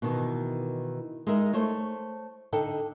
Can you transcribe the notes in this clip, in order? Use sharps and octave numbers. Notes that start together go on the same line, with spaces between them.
B2 D#3 E3
G#3 D#4 E4 A#4 E5
A3 C5 C#5
D3 D#4 A4 G5